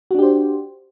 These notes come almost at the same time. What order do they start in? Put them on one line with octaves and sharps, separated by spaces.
F#4 D4 G4 C5